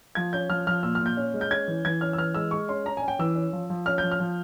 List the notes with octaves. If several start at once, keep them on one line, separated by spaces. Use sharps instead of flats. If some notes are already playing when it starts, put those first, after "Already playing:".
F3 G#6
C#4 G6
F3 F6
F3 F6
A#2 E6
F6
A#2
G6
C#4
G#3
G6
C#4 G#6
E3
E3 G#6
C#4 F6
E6
E3 F6
G#3 E6
G#3 C#6
C#4 C6
C#4 A#5
G#5
C#4
G5
E3 E6
C#4
F3
F3
C#4 F6
G6
F3
F6
F3